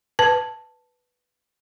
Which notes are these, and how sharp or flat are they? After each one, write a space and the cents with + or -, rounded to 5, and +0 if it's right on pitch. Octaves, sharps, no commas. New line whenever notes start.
B4 +0 A5 +0